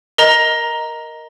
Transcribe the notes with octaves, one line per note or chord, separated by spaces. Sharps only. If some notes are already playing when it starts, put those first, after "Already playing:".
A#4 D#5 A#5